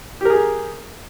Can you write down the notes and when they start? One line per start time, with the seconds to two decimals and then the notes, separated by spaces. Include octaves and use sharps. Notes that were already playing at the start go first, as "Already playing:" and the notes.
0.21 G4
0.25 A#4
0.30 G#4